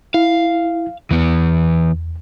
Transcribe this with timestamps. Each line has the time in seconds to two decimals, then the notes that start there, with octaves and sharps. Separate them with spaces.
0.14 E4 F5
1.11 E2 E3 B3